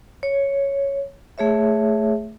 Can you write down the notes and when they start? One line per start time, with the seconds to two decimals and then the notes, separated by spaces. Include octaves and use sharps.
0.23 C#5
1.38 A3 G#4 C#5 E5